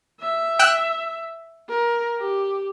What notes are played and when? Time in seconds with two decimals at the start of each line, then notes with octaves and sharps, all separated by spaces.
0.21 E5
0.59 G5 E6 F#6
1.70 A#4
2.19 G4